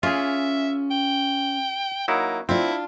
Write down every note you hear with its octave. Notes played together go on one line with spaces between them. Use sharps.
C#4 F4 G#4 E5
G5
F#3 A#3 D#4 E4
C4 D4 E4 F4